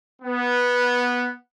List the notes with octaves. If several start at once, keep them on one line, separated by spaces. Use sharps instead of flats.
B3